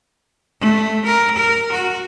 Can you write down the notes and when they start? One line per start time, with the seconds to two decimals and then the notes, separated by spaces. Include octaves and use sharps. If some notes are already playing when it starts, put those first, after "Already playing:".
0.61 A3
1.06 A#4
1.36 A#4
1.72 F#4